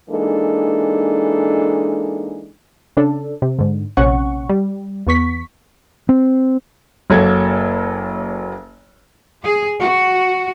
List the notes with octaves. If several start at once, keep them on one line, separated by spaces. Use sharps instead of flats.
E3 G#3 A#3 D4 D#4 A4
C#3 D4 A4
C3
G#2 D3
A#1 C3 C#4 F#5 C#6
G3
E2 B3 C#6 B6
C4
F#1 F#3 A#3 A4 G#6
G#4
F#4